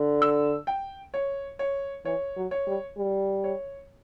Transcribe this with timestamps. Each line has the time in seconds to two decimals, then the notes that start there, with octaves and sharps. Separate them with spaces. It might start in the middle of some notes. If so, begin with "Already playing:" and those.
Already playing: D3
0.22 E6
0.67 G5
1.14 C#5
1.59 C#5
2.05 E3 C#5
2.37 F#3
2.51 C#5
2.67 G3
2.98 G3
3.44 C#5